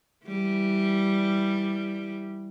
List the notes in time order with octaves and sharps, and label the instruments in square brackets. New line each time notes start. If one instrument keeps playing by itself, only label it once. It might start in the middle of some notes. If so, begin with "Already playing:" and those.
[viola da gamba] E3 G3